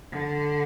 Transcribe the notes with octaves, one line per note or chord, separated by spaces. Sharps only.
D3